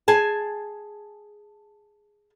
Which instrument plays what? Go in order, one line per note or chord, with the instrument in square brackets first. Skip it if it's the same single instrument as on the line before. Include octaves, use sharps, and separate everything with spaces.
[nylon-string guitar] G#4 G#5 A5